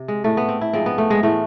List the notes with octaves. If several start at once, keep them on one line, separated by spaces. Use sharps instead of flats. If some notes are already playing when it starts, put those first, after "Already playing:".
Already playing: C3
G#3
A2 G#3 A3
B3
C4
E4
G#2 F3 G#3 C4
B3
A3
G#3
A2 E3 G#3 A3